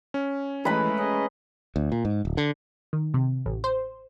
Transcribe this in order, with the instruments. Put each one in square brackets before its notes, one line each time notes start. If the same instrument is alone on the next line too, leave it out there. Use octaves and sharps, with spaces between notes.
[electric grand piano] C#4
[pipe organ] E3 [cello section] G#3 A3 [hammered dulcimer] B4 A#5 B5
[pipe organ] C#4 G#4 D#5
[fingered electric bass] D2
A#2
G#2
D1
D3
[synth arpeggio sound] D#3
C3
A1
C5